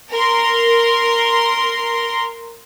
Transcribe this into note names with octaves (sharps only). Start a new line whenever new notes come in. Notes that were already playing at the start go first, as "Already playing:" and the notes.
A#4 C6